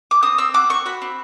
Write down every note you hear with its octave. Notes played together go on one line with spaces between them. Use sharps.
D6
C4 D#6
C4 E6
F#4 D6
C4 C#6
F#4 B5
C4